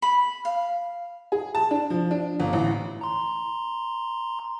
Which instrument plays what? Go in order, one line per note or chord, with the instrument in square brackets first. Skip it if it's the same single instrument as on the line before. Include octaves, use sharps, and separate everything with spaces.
[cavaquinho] B5
F5
[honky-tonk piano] G#4
A5
D4
F3
D4
G1
A1
[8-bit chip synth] A#5 C6